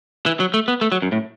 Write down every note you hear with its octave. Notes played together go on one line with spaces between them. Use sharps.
E3
F#3
A3
B3
A3
F#3
F#2
A2